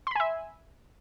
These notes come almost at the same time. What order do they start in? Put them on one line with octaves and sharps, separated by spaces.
C6 B5 G#5 E5